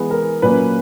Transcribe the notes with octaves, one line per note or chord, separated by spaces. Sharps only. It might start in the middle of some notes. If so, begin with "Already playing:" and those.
Already playing: E3 G#3 B3
A#4
A#2 F#3 A#3 C#4 B4